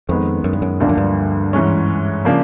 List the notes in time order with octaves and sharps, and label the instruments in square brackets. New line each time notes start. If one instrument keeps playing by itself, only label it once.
[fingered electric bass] F2 [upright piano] D#3 G#3 B3
[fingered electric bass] F#2
G2
F#2
[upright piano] D2 D3 F3 A#3 D4 [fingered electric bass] G2
[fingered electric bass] F#2
G2
[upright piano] G#2 E3 G#3 C#4
C#3 F3 A#3 D4